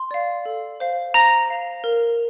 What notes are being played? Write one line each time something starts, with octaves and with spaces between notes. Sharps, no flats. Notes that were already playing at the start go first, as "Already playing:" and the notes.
Already playing: C6
D5 F5
A4
C5 F5
C5 A#5 A#6
F5
A#4